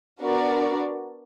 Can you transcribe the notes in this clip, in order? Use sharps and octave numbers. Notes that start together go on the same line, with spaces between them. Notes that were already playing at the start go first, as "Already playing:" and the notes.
B3 D4 F#4 A#4 D5